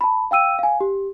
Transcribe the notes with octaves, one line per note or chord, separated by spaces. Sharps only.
A5 B5
F5 G5 E6 D#7
F5 G#5
G4